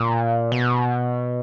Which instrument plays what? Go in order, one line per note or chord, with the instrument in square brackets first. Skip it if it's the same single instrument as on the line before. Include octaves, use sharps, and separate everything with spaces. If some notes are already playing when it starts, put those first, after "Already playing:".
Already playing: [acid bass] A#2
B2